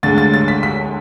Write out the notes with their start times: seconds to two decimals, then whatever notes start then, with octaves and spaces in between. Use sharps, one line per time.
0.03 D2 D3 G#3 A6
0.18 A6
0.34 A6
0.48 B6
0.63 B6